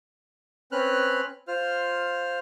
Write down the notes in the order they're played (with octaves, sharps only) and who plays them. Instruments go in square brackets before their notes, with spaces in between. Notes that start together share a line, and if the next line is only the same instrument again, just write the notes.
[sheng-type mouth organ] C4 C#4 B4 F6 F#6
F4 C5 F6